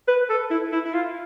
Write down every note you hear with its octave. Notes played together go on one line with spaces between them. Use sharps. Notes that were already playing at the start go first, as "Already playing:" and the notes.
B4
A4
E4
E4
E4
F4